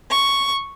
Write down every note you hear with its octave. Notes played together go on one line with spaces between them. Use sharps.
C#6